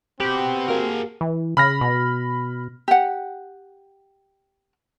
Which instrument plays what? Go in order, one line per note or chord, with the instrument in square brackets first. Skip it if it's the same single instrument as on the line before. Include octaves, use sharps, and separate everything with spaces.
[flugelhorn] C4 [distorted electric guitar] F#4 B4 [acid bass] G4
[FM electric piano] A#3 F#4 [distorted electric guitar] G#4 A#4
[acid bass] E3
[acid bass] C#3 [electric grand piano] B5 F6 A#6
[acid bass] B2
[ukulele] G4 F#5